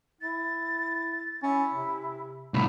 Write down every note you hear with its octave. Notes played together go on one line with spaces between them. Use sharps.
E4 A6
C#4 E4
C3
C2 A2 B5